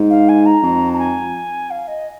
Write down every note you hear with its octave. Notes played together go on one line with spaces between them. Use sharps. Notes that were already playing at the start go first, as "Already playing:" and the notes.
Already playing: G#2
F5
G#5
A#5
F2
A#5
G#5
F5
D#5